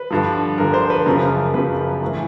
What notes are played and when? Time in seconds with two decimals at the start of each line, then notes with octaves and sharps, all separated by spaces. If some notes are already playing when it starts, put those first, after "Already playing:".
Already playing: B4
0.10 G2 D3 F3
0.58 G2 D3 F3 A#4
0.74 C5
0.90 B4
1.06 F#2 C#3 F3 A#4
1.54 F#2 C#3 F3 B4
2.02 A2 E3